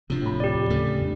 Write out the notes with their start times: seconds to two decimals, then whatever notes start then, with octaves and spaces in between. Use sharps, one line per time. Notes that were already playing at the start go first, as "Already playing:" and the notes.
0.10 D1 C3 F3 D4
0.22 A2 B5
0.40 G4 D5
0.54 D#2
0.70 C#3 A3
1.01 E2 G#3 D4